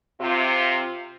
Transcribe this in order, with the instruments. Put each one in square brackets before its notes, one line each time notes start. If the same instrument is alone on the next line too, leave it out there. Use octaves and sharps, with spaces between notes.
[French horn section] C3 F4